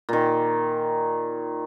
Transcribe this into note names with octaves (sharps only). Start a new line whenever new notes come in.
A#2 D#3